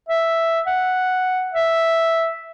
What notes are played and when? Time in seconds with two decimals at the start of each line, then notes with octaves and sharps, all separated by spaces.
0.09 E5
0.67 F#5
1.53 E5